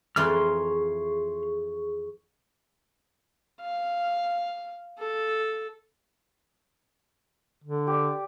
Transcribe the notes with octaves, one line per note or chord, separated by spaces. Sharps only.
F2 E3 G#4 D5 C6 C#6 F6
F5
A4
D3
G4 D5